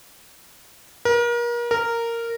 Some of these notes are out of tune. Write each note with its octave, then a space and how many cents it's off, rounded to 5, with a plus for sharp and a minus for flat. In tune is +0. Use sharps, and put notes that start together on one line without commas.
A#4 +35
A#4 -10